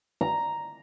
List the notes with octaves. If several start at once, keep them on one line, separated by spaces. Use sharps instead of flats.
A#5